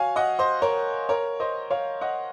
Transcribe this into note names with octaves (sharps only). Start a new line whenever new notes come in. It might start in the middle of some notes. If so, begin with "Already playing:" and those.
Already playing: F#4 C#5 F5 G#5
D#5 F#5
C5 D#5
A#4 C#5
A#4 C#5
C5 D#5
C#5 F5
D#5 F#5